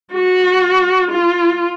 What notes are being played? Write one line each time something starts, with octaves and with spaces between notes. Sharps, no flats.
F#4
F4